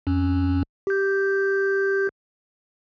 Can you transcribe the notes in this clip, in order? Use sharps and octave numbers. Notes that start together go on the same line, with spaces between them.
F2 C#4
G4 G6